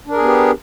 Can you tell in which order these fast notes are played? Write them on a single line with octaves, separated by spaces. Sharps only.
D4 A#4 G#4 B3 G4